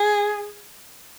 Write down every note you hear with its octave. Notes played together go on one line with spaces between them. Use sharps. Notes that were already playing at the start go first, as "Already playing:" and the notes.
Already playing: G#4